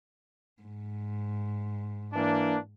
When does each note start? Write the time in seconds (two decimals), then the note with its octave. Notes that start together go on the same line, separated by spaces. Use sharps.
0.62 G#2
2.13 E3 A#3 D4